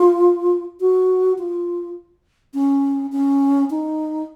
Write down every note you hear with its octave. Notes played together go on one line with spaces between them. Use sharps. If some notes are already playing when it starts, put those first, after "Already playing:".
Already playing: F4
F#4
F4
C#4
C#4
D#4